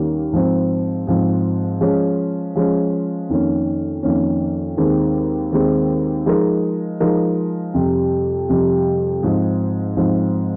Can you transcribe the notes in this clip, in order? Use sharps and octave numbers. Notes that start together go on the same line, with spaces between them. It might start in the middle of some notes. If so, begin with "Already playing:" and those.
Already playing: D#2 D#3 G3 A#3 C#4
G#2 F3 C4
G#2 F3 C4
F3 G#3 C#4
F3 G#3 C#4
F2 D#3 A#3 C#4
F2 D#3 A#3 C#4
D#2 D#3 G#3 C4
D#2 D#3 G#3 C4
F3 G#3 D#4 A#4
F3 G#3 D#4 A#4
F2 C3 G3
F2 C3 G3
G#2 F3 C4 D#4
G#2 F3 C4 D#4